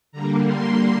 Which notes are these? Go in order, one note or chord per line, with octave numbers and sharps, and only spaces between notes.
D3 G3 A#3 A#5
C6